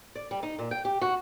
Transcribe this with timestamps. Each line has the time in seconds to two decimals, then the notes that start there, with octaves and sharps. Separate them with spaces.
0.15 D5
0.31 G3
0.43 D#4
0.59 A#2
0.71 G5
0.85 G4
1.01 F#4